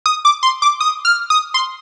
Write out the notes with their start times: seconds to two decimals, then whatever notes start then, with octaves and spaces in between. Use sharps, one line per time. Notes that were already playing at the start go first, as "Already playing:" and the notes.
0.06 D#6
0.25 D6
0.43 C6
0.62 D6
0.80 D#6
1.05 F6
1.30 D#6
1.54 C6